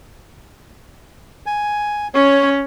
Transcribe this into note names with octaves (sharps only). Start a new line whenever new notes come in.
G#5
C#4 C#5